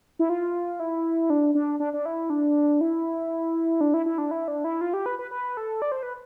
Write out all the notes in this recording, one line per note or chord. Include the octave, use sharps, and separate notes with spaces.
E4
F4
E4
D4
D4
D4
D4
E4
D4
E4
D4
E4
E4
D4
E4
D4
E4
F4
G4
B4
B4
B4
A4
D5
C5
B4